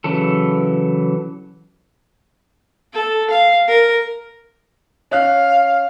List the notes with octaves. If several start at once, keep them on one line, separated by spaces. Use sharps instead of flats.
C#3 E3 F#3 A4
A4
F5
A#4
C#4 F5 F#6